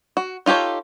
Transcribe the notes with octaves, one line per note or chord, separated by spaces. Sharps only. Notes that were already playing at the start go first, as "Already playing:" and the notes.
F#4
D#4 F4 G4 A4 C#5